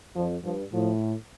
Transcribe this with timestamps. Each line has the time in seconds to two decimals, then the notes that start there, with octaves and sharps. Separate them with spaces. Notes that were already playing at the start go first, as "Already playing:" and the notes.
0.15 F2 F3
0.44 G2 F3
0.73 A2 F3